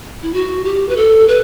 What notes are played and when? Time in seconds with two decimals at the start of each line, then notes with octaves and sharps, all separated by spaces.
0.23 E4
0.34 F#4
0.65 G4
0.89 B4
0.97 A4
1.28 B4